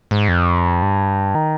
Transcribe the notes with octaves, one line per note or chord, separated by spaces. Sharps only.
G#2
F2
G2
D#3